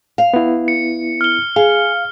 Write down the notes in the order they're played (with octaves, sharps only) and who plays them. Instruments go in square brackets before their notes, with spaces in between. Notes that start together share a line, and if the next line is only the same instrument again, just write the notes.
[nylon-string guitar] F5
[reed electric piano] B3 E4
[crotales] C#7
F6 G7
[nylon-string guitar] G#4 [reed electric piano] F5